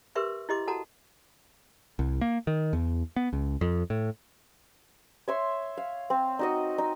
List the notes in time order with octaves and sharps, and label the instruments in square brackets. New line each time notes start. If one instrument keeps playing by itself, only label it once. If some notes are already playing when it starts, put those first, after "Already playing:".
[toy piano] G4 A#4 B4 E5 C6 C#6
E4 G4 D#5 C6 D6
F#4 A4 F#5 A5 A#5
[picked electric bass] C2
A#3
D#3
E2
B3
C#2
F2
A2
[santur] C#5 E5 C6
F5
C4
D#4 F#4 D#5
D#4